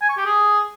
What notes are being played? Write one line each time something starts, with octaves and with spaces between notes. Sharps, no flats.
G#5
C#6
G4
G#4